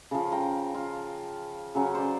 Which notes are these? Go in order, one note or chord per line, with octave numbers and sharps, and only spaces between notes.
C#3 F3
G5 A#5
F4
C#3 F#3 C#4
C5 D5